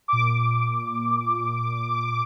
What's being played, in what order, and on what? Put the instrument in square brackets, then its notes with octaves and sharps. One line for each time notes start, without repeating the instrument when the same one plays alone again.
[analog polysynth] A#2 D6